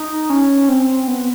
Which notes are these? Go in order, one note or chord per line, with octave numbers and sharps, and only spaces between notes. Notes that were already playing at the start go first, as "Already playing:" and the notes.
Already playing: D#4
C#4
C4
B3